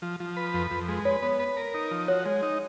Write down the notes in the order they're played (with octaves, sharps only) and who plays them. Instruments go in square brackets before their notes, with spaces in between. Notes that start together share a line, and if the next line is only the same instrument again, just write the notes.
[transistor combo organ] F3
F3
B4
F2
F2
G#3
[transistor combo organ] B4 [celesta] C#5
[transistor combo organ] B3
B4
A#4
D#4
F3
[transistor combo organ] F#4 [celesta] C#5
[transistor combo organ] G#3
D#4